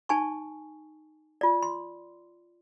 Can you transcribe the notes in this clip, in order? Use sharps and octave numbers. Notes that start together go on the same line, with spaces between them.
D#4 G#5 A5 C#6
F4 D5
C6